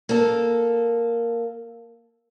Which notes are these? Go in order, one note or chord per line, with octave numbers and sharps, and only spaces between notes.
A#3 A4